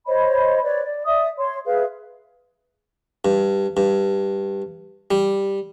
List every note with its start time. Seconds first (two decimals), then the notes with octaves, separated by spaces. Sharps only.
0.07 C5 C#5 D#5 B5
0.63 B4 C#5 D5
0.84 D5
1.06 D5 E5 D#6
1.38 C#5 C6
1.66 G#4 B4 E5 F5
3.25 G2
3.77 G2
5.11 G3